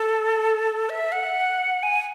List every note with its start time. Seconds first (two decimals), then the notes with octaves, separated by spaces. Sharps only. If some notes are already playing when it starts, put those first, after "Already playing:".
Already playing: A4
0.89 E5
1.12 F#5
1.83 G#5